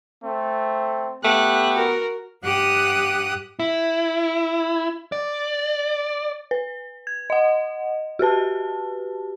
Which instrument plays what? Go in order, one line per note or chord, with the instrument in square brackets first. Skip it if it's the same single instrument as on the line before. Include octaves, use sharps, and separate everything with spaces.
[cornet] A3 [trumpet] C4
[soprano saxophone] A3 [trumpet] B3 [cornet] G4 [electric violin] F#6
[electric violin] F#4 A#4
[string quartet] G2 G4 F#5 D#6 F#6
[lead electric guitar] E4
D5
[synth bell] B4
G#6
D#5 F#5
F#4 G4 B4 A5